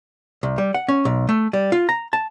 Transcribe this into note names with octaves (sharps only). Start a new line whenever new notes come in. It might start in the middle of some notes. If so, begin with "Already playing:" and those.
C2
G3
F#5
C#4
B1
A3
G3
F4
A#5
A5